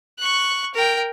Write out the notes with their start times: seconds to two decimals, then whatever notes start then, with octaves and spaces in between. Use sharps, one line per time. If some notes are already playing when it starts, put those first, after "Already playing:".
0.19 C#6 F#6
0.74 A#4 G5